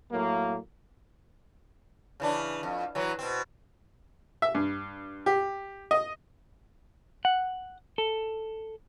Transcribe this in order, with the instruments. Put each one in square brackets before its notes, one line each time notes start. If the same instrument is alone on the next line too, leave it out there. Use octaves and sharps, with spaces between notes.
[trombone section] A2 F#3 A#3
[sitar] C#3 E3 D4
F2
E3 F#3
B2 C4
[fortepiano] E5
G2
G4
D#5
[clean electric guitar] F#5
A4